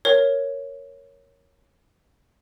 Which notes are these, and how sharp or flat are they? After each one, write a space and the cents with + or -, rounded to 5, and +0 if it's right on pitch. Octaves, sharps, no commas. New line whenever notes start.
A#4 +0 C#5 +0